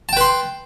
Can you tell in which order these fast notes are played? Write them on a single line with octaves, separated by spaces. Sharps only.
A5 G5 B4 C6